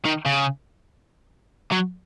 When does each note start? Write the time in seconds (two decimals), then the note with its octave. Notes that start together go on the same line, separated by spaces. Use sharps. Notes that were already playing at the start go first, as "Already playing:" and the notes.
0.05 D#3
0.26 C#3
1.72 F#3